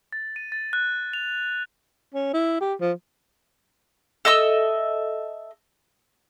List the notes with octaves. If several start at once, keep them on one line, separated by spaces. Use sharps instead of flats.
A6
D#7
A6
F#6
F7
C#4
E4
G4
F3
A4 D#5 E5 E6